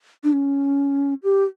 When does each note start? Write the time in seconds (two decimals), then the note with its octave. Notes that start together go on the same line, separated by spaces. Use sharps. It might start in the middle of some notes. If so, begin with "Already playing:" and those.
0.24 D4
0.33 C#4
1.23 G4